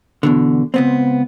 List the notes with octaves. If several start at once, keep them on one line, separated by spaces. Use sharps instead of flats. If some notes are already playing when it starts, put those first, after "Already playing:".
E2 B2 D3
C#2 B3 C4